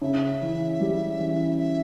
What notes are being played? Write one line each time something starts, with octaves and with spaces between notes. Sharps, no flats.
C#3 E5
E3
G3
E3
E5